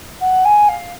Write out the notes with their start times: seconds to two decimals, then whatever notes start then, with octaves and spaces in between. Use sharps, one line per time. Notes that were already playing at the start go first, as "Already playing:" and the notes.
0.20 F#5
0.45 G#5
0.68 F5